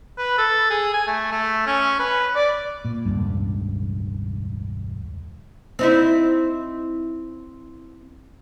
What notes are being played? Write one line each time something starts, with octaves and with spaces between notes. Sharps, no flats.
B4
A4
G#4
G#5
A3
A3
C#4
B4
D5
A#2
E1 C#2 G2
C4 D#4 E4